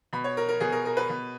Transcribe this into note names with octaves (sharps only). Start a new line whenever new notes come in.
B2 B5
C#5
A#4
A#4
B2 G#4
A#4
A#4
B4
B2